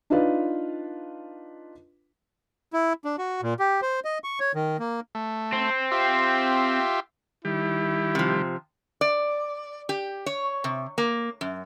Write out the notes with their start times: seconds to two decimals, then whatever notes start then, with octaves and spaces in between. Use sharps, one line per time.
0.10 D4 D#4 F4 B4 F5
2.73 E4
3.05 D4
3.18 F#4
3.42 A#2
3.59 G4
3.82 C5
4.05 D#5
4.24 C#6
4.40 C#5
4.55 D#3
4.80 A#3
5.15 A3
5.53 C4
5.91 F4 G4 E5
7.45 D#3 G3 E4 G4
8.15 C3 F3
9.01 D5
9.89 G4
10.26 C#5
10.64 C3
10.98 A#3
11.41 F#2